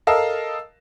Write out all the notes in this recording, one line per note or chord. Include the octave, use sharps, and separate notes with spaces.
A4 A#4 D#5 F5 A5 E6